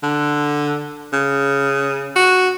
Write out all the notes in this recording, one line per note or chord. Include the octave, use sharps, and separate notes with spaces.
D3
C#3
F#4